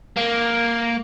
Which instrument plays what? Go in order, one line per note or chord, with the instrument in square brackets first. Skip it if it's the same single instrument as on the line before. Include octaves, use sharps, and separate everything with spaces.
[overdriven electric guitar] A#3